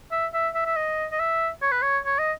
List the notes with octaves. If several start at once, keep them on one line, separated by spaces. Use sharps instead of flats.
E5
E5
E5
E5
D#5
D#5
E5
C#5
B4
C#5
C#5
D#5